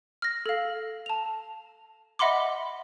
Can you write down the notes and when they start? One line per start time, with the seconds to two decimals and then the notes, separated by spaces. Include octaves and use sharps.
0.22 F6 A#6
0.46 A4 F5
1.06 A5 F7
2.19 D#5 E5 F#5 B5 C6 D6